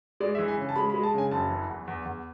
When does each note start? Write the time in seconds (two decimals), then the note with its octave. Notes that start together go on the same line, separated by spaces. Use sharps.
0.20 G#3 D5
0.35 E5
0.39 E3
0.48 G#5
0.57 C#3
0.69 A5
0.76 G#3 B5
0.90 B5
0.94 G#3
1.03 A5
1.14 C#3 G#5
1.31 F#1 A5
1.50 E3
1.69 E2
1.88 E2
2.05 E2